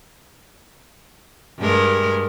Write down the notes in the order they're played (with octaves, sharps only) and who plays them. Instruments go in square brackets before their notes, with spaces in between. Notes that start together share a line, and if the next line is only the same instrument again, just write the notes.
[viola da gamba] G2 G#3 A#4